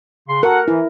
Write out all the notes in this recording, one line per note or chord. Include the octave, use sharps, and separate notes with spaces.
C#3 C6
F#4 A4 A#4 F#5
E3 E4